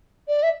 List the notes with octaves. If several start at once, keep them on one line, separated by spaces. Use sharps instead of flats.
D5
E5